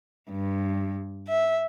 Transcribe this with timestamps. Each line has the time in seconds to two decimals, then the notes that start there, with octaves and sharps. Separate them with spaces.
0.30 G2
1.28 E5